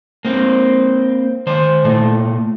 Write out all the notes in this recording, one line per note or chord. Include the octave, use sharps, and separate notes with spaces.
A#3 C4
D#3 C5
A#2 A3